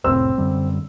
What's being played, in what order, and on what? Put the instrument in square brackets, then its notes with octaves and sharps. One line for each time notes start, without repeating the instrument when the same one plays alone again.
[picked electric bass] F1 C2 A2 [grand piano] C4 E6
[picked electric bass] F#2 D3 G3